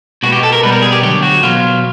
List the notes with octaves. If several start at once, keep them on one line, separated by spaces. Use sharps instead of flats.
B2 G#3 B3 F#4
G4
A4
A#4
B2 G3 B3 B4
A#4
G#4
G4
D3 F#3 A3 G4
F#4
B2 F#3 B3 F4